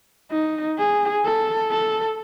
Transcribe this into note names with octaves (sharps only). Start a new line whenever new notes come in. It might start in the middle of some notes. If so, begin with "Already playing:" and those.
D#4
G#4
A4
A4